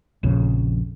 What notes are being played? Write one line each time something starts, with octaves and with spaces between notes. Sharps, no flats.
A#1 F2 C#3